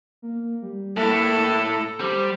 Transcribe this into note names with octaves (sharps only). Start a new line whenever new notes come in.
A#3
G3
A2 A#3 E4 A4
A#5
G3 C5